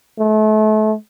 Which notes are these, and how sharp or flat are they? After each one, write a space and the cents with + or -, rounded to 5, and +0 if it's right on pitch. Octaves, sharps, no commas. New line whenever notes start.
A3 -35